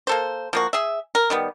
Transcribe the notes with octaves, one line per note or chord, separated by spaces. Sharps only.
A#3 A4 C5
F3 A#3 F#4
G#4 E5
A#4
D#3 G3 B3